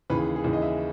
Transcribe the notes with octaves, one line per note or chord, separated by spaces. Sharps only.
D#2 C#3 E3 B4
G#4
G#4
D#2 C#3 E3
D#5
E5